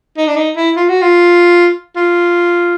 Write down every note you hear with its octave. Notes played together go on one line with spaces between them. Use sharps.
D#4
D4
D#4
E4
F4
F#4
F4
F4